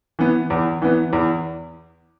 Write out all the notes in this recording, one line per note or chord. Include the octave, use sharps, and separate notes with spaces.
E3 B3
E2
E3 B3
E2